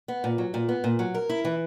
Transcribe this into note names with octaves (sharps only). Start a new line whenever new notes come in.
B3
A#2
F#3
A#2
B3
A#2
F#3
A#4
E4
E3